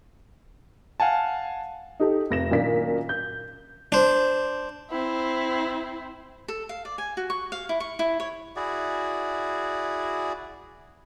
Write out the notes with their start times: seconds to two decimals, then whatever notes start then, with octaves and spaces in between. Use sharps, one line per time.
1.00 F5 F#5 G#5 A5
2.00 D#4 G4 A4
2.30 F1 A#6 E7
2.51 F#2 A#2 D#3 D4 B6
3.09 G6
3.92 D4 C5
4.90 C4 E4
6.48 A4
6.69 F5
6.85 D5
6.98 G#5
7.17 F#4
7.30 C#6
7.52 F5
7.69 E4
7.80 C#6
7.99 E4
8.20 C#5
8.56 E4 F#4 G#4 D5